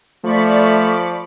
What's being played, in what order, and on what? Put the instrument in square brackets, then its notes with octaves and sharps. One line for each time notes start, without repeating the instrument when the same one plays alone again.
[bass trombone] F3 [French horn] A3 [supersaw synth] D5 B5 C#6